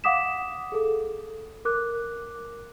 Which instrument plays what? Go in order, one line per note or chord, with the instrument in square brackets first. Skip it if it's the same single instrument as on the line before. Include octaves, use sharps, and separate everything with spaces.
[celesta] F5 F#5 D6 D#6 B6 E7
G#4 A4
A#4 D6 F#6